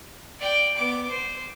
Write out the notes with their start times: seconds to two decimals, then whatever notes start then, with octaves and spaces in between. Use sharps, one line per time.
0.40 D5 G5
0.77 B3 D6
1.09 C5